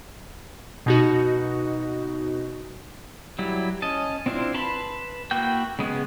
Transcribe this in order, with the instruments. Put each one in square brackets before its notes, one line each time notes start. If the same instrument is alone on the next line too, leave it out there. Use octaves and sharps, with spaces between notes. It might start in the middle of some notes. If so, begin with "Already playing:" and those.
[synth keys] B2 D#4 F#4
[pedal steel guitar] F#3 G3 E4
C#4 D#5 A5
C4 D4 E4 F4 C5
B4 A5 B5 C6
A#3 E4 F#4 G5 G6
C#3 G#3 B3 C#4